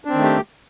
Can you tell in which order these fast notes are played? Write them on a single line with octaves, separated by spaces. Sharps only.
D4 C4 D#3 A3 G4